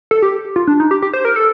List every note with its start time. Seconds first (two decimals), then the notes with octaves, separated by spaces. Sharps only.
0.11 A4
0.22 G4
0.56 F4
0.67 D4
0.80 D#4
0.91 G4
1.02 G4
1.13 C5
1.25 A#4
1.36 A4